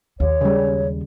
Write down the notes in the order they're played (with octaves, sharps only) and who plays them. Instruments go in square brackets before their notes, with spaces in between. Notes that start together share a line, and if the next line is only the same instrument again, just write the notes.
[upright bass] D#2 [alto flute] C#5
[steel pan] C#3 G3